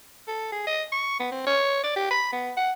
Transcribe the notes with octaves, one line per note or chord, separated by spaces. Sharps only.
A4
G#4
D#5
C#6
B3
C4
C#5
D5
G4
B5
B3
F#5